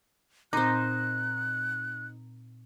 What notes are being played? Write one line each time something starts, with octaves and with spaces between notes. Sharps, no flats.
A#2 C4 D#4 C5 F#6